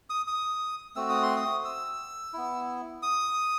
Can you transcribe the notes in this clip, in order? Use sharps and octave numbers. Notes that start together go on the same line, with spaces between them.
D#6
D#6
A3 C4 F#4 E6
D#6
C6
D#6
E6
B3 E4
D#6